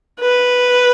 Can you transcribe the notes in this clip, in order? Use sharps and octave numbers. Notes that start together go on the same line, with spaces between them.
B4